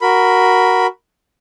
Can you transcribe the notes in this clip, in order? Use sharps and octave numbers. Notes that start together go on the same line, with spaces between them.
F#4 A#4 B5